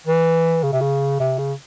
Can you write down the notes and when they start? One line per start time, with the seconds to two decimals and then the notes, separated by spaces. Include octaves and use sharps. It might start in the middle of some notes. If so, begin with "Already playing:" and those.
0.07 E3
0.63 C#3
0.72 C3
0.81 C#3
1.20 C3
1.39 C#3